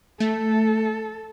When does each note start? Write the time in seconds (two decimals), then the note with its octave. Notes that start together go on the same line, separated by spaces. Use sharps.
0.20 A3 A4